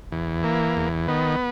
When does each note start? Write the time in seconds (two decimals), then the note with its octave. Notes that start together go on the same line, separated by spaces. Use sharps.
0.12 E2
0.43 E3 A#3
0.76 E2
1.08 D#3 B3